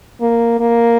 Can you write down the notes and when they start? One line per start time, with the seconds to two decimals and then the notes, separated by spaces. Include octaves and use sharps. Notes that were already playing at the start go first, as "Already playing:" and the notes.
0.21 A#3
0.60 A#3